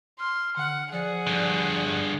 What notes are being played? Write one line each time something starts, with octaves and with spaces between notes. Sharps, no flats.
C6 F6
D3 F#5
F3 G#4 D5 F#5
G2 D3